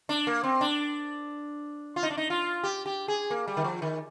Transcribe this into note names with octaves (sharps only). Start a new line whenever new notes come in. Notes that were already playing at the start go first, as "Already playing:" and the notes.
D4
A#3
C4
D4
F4
D#4
D4
D#4
F4
G4
G4
G#4
A#3
G3
D#3
F3
D#3